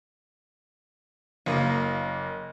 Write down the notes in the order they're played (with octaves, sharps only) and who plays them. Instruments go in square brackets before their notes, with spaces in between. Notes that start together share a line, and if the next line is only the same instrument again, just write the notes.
[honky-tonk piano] F#1 A#3 [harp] D#5